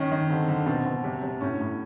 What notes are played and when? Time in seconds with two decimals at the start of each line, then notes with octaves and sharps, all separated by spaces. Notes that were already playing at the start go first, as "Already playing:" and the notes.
Already playing: D#3 C#4
0.11 D#3
0.30 D3 C4
0.48 D3
0.66 B2 C4
0.85 B2
1.04 C3
1.22 C3
1.41 A2 C#4
1.60 A2